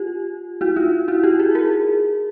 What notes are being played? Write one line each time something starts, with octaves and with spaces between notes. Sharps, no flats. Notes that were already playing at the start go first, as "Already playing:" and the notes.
Already playing: F4 G4
E4 F#4
D#4 F4
E4 F#4
F4 G4
F#4 G#4
G#4 A#4